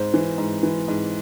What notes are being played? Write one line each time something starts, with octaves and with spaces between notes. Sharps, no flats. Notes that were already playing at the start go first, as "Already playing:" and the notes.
Already playing: G#2 C5
E3
G#2
E3
G#2